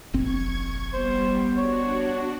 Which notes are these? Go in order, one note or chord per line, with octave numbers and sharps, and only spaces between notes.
F1 A#1 C4 C#6 G#6
G3 B3 C5
D4 F#4 C#5